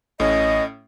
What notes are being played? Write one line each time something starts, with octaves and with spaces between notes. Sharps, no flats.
A1 A2 C#4 D#5